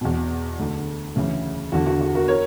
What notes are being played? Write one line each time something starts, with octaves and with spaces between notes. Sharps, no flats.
E2 B2
D2 D3
D2 C#3 E3
E2 D3 F#4
F#4
F#4
F#4 A#4
A#4 C#5